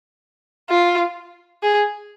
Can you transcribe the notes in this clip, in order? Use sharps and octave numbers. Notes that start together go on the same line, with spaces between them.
F4
G#4